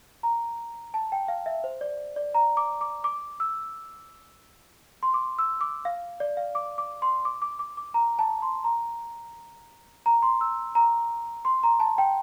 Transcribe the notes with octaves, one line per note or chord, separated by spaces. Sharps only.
A#5
A5
G5
F5
E5
C5
D5
D5
A#5
D6
D6
D6
E6
C6
D6
E6
D6
F5
D5
F5
D6
D6
C6
D6
D6
D6
D6
A#5
A5
C6
A#5
A#5
C6
E6
A#5
C6
A#5
A5
G5